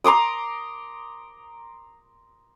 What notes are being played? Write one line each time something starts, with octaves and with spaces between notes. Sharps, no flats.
A#5 C6 D6 D#6